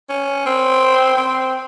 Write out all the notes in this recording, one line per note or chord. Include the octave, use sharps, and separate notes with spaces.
C#4
C4
C4